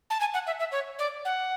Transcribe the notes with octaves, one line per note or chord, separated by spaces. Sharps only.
A5
G#5
F#5
E5
E5
C#5
D5
F#5